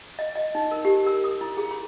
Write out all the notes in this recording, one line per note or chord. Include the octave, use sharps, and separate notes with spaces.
D#5
D#5
D#4
A#4
G4
A#4
D#6
E4
G#4
C6